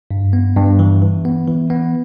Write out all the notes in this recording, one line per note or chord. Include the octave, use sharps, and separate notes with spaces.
G2
B3
G2
E3
E3
B3
E3
B3